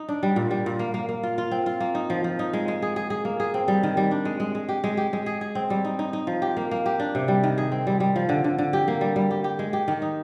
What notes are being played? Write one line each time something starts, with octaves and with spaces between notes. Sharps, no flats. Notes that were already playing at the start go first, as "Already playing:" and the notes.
Already playing: D#4
D4
G3
A#2
G3
A#2
A#3
A#3
A#3
F4
F4
C4
F4
A#3
D#4
F3
F3
D#4
G#3
G#3
G#4
G#4
G#4
A#3
G#4
C4
G3
D#3
G3
D4
G#3
G#3
G#3
G4
G#3
G4
G#3
G#4
G#4
C4
G3
D#4
D#4
D#4
F3
G4
A#3
A#3
G4
D4
C3
G3
D#3
G#4
C4
G3
G3
F3
D3
D3
D3
G4
A#3
G3
G3
G4
G4
G#3
G4
D#3
D#4